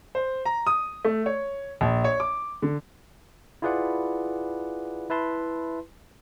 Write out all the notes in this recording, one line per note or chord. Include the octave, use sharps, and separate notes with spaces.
C5
A#5
D#6
A3
C#5
A#1
C#5
D6
D3
E4 F4 G#4 B4 D5 F#5
E4 B4 E5 A5 C6